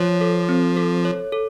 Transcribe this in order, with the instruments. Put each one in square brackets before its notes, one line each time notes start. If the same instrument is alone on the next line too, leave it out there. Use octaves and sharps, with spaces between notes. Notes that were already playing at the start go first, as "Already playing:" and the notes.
Already playing: [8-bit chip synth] F3 [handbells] C#5
[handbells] A4
C4
A4
C#5
A4